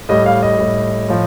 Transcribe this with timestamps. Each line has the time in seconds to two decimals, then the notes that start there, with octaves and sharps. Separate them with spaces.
0.09 A2 G3 D#5
0.26 F5
0.43 D#5
0.59 A2 G3
1.09 A2 F3